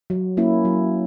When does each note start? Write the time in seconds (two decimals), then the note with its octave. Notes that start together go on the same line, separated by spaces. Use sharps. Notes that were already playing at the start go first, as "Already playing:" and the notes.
0.10 F#3
0.37 A#3 C#4 E4
0.65 F#3